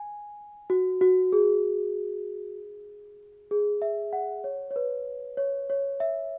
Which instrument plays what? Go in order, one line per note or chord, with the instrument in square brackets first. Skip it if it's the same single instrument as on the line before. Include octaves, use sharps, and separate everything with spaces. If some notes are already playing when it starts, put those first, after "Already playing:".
Already playing: [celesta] G#5
F#4
F#4
G#4
G#4
E5
F#5
C#5
C#5
B4
C#5
C#5
E5